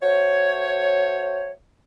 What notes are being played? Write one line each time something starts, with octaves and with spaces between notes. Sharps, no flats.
A3 F#4 C5 C#5